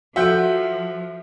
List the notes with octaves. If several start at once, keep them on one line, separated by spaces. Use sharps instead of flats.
F3 F#4 A4 E5 F#5 G6